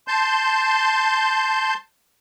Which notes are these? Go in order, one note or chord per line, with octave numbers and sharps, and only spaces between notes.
A5 C6 G6